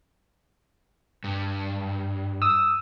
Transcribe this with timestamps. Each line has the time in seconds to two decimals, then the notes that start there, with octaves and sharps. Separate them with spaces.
1.24 G2
2.42 D#6 E6